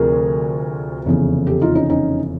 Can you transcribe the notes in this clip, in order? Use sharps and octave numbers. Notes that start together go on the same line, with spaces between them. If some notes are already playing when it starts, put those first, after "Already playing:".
Already playing: D2 C3 F3 G#4 A#4
F1 E2 C#3
G4 A4
D#4 F4
C#4 D#4
C#4 D#4